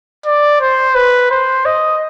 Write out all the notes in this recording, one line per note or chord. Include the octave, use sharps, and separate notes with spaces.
D5
C5
B4
C5
D#5